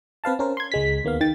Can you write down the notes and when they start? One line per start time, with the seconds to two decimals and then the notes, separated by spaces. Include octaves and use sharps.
0.24 C4 B4 F5 A5
0.39 C#4 A#4 C5
0.57 C6 G#6
0.72 C#2 G#3 B6
1.05 D#2 A#3 B3 F5
1.21 D#3 G5 A6